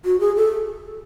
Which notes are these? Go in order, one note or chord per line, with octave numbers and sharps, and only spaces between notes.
F#4
G#4
A4